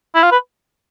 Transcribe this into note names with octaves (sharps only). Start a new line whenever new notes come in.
E4
F4
B4